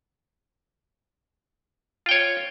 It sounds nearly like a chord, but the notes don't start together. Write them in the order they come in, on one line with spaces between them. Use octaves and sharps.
F4 G5 C#5